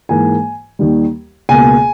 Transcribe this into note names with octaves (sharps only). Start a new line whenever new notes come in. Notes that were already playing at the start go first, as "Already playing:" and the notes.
G#2 E3 A#3 G#5
D#2 D#3 G3
C#2 B2 A#3 G#5